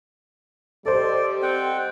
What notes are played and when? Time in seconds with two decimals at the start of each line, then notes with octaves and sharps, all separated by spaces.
0.85 G3 G4 A4 C5 D5 D#5
1.42 C4 F#5 G5